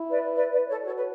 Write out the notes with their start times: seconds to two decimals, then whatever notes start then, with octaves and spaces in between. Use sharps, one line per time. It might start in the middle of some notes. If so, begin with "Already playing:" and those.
Already playing: E4
0.11 B4 D5
0.35 B4 D5
0.52 B4 D5
0.67 A4 C#5
0.84 F#4 A4 C#5
0.96 B4